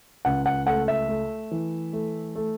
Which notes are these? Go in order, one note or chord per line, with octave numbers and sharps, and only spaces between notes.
C#2 F#5
F#5
A3 F#5
E5
A3
E3
A3
A3